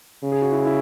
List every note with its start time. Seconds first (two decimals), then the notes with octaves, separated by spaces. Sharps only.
0.23 C#3
0.32 G#4
0.42 F#4
0.52 E4
0.65 E4